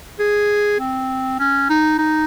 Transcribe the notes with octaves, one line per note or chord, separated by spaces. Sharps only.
G#4
C4
C#4
D#4
D#4